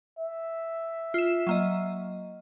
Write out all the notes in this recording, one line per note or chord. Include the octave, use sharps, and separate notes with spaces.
E5
F4 E7
F#3 A#3 D#5